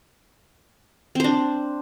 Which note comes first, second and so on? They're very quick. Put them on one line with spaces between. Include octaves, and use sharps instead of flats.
C4 C5 D4